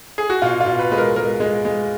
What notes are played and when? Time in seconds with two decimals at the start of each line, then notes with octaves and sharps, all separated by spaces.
0.18 G#4
0.30 F#4
0.42 B2 F4
0.60 F4
0.66 B2
0.79 B4
0.91 G#3 B4
0.98 A#4
1.16 G#3 A#4
1.40 G#3
1.65 G#3